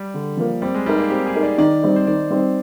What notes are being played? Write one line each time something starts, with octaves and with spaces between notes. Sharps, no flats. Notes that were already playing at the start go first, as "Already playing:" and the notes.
Already playing: G3
D3
F3 A#3
G3 C4
G#3
G3 D#4 A#4
A#3
C4 G4
G#4
D#4 A#4
D5
D#3 D5
G3 C4 D#4
C5
D#3 D5
G3 C4 D#4